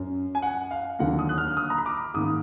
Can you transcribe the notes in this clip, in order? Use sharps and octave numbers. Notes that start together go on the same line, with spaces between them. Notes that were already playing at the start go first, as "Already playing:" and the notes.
Already playing: F#2
G#5
F#5
F5
D#2 D3 F#3 A#3 F#5
D#6
F#6
F6
D#6
A#5
B5
D6
G#2 D#3 A#3 D#6